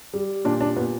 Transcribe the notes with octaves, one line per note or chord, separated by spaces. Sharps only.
G3
A#2 D4
D4
A#2 B3